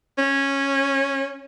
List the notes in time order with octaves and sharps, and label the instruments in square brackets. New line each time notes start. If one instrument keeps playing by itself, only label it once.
[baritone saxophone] C#4